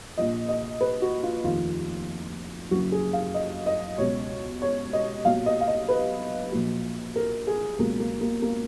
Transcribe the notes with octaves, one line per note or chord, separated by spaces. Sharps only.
A#1 A#2 F3 D#5
D#5
B4
F#4
F4
F1 D#2 D#3 F4
F#1 F#2 C#3 F#3 F#4
G#4
F5
D#5
D#5
C#2 B2 F#3 C#5
C#5
D#5
B1 A#2 F#3 F5
D#5
F5
D#5
B4
A#1 A#2 F#3
A#4
G#4
C#2 B2 F#3 A#3
A#3
A#3
A#3